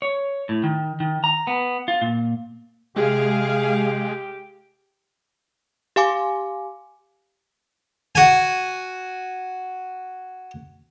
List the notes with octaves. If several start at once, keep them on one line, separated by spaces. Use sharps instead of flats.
C#5
A2
D#3
D#3
A#5
B3
F4
A#2
C3 G#3 G4 G#4 F5
G4 F5 G#5 D6
F#4 G#5